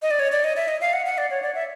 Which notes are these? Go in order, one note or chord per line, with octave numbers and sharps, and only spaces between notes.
D#5
D5
C#5
D5
D#5
E5
D#5
F5
F#5
F#5
D5
C#5
D5
E5